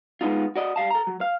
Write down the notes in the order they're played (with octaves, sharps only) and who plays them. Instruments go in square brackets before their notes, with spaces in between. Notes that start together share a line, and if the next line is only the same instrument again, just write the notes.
[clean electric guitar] G#3 B3 D#4 F4
F#4 D5 D#5
G3 F5 A5
A4 A#5
F#3
F5